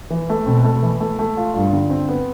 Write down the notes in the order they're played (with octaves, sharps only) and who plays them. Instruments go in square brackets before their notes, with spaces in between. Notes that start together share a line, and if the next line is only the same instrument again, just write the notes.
[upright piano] E3
A3
[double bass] B2 [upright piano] C4
[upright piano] A3
E3
A3
A3
F4
[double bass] G2 [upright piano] F4
[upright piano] D3
C4
B3